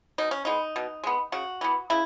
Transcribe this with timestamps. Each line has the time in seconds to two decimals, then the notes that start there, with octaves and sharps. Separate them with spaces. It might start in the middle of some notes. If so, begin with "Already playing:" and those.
0.18 B2 D#4
0.31 C#4
0.45 G#3 B3 D#4
0.76 B2
1.04 G#3 B3
1.32 C#3 F#4
1.61 E3 B3
1.90 C#3 E4